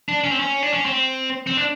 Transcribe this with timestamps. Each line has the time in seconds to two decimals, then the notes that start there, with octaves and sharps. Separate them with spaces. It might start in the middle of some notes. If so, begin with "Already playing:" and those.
0.09 D4
0.24 C#4
0.31 C4
0.40 C#4
0.63 D4
0.74 C#4
0.85 C4
1.47 C4
1.57 D4